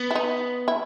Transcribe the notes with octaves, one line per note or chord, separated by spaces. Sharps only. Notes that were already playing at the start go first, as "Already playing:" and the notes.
Already playing: B3
E4
D#4
E4